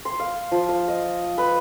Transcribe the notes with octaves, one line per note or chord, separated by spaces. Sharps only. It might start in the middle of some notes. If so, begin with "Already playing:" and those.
C6
F5
F3
F5
D#5
B4